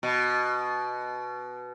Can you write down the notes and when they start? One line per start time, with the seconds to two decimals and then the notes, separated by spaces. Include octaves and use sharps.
0.03 B2